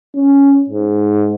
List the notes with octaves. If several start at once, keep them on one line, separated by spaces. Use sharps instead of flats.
C#4
G#2